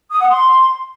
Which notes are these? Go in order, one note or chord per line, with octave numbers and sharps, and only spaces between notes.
D#6
F#5
C6